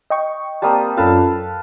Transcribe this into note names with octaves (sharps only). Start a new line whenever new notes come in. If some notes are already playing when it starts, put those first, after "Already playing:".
D#5 G5 C#6
G3 A#3 C4 A5 D#6
F#2 C#4 F4 A4 B4 F5